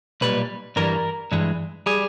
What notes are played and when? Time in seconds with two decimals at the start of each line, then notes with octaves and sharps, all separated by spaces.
0.21 B1 A#2 G3 B4
0.76 G2 E3 G3 A#4
1.32 G2 E3 G#3
1.86 G3 G#4